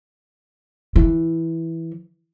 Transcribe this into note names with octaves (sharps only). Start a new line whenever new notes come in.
E3